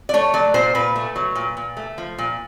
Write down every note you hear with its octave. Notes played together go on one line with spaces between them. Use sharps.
D5
A3 C#5
F#3 D5
A#2 C5
A#2 B4
A3
F#3
A#2
A#2
A3
F3
A#2